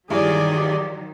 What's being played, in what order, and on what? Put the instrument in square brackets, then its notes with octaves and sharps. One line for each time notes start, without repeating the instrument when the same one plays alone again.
[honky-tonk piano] G2 E3 [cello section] D#3 F#3 [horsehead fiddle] G#4 D5